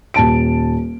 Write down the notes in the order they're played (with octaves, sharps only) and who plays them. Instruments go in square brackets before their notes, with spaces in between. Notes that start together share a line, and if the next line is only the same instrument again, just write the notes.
[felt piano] D#1 A5 D7